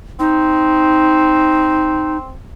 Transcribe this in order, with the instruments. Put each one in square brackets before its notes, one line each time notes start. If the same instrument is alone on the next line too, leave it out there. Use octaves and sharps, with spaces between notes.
[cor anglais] C4 [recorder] D#4